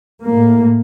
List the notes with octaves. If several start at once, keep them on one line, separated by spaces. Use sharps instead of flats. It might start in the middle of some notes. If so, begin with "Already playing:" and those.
A2 A#3